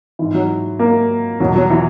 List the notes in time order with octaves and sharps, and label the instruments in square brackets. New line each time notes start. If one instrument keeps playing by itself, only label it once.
[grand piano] G#2 E3
F#3
A#3
E2 B2 F#3
F#3
E3